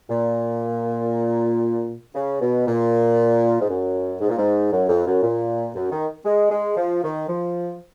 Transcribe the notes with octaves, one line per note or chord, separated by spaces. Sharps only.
A#2
C#3
B2
A#2
G#2
F#2
G#2
A#2
G#2
F#2
F2
F#2
A#2
F#2
D#3
G#3
G#3
F3
D#3
F3